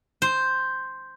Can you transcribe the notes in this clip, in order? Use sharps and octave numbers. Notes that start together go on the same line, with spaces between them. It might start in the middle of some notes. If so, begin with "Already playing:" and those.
C5